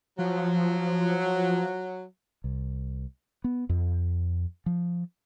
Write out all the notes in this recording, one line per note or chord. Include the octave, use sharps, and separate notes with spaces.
F3 F#3
C2
B3
F2
F3